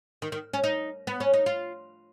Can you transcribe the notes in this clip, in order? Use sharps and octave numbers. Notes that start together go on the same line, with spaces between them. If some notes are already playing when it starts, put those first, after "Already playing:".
D#3
D#3
C#4
D#4
B3
C#4
D#4
F4